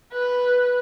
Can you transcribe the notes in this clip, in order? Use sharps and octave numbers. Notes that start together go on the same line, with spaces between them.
B4